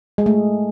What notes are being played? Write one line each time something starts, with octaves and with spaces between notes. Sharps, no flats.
G#3
A3